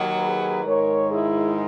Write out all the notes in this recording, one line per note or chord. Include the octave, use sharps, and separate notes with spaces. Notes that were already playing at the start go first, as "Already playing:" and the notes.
Already playing: D#2 D#3 F#3
G#4 B4
G#2 D#3 G#3 A#4 C#5
E4 G#4